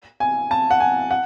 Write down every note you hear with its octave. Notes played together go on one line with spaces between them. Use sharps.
G#5
A5
F#5
G#5
F#5